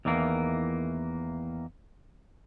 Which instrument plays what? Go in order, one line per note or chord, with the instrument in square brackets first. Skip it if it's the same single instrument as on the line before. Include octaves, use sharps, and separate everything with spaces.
[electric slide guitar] E2 D#3 E3 A#3